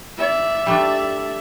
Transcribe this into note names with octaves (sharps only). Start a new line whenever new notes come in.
D5 E5
G3 A3 D4